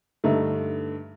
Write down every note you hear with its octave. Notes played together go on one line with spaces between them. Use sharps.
G2 D3 A3 D#4